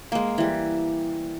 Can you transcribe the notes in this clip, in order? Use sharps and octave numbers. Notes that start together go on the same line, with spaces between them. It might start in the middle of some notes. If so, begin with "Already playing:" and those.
G#3 A#3
E3 G3